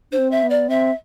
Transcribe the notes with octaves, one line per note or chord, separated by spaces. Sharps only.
D4 C5
C4
E5
B3
D5
C4 E5